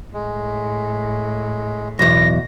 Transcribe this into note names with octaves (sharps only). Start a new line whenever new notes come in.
A2 G#3
B1 E2 A#6